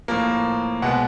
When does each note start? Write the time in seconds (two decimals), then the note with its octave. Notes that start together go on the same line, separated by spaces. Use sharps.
0.08 A2 F3 A#3
0.82 B2 G#3 B3 F#5